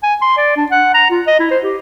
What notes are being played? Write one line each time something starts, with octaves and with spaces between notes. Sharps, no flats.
G#5
C6
D5
D4
F#5
A#5
F4
D#5
E4
C5
G4